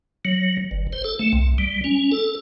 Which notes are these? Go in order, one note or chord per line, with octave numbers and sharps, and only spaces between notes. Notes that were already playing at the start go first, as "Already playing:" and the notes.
F#3
G1
C5
A4
A3
C2
G3
C#4
A4